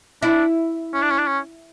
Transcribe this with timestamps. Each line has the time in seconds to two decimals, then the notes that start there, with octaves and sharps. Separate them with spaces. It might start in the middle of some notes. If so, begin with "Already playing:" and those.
0.22 D4 E4
0.94 C#4
1.02 D4
1.10 C#4
1.19 D4
1.27 C#4